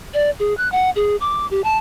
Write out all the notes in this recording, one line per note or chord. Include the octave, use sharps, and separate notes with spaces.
D5
G#4
F#6
F#5
G#4
D6
G4
A5